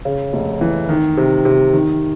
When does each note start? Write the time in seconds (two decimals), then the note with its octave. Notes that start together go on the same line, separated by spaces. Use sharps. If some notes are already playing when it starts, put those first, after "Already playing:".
0.05 C#3
0.33 F1
0.61 E3
0.89 D#3
1.17 C3
1.45 C3
1.73 D#3